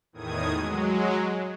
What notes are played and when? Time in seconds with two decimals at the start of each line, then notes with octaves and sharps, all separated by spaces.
0.13 E2 A2 D#3 D#6 G#6
0.54 F#3 G#3